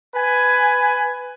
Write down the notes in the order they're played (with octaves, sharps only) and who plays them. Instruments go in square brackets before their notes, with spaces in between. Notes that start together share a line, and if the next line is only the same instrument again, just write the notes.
[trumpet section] B4 G#5